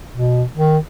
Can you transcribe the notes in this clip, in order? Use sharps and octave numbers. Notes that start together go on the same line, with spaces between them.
B2
D#3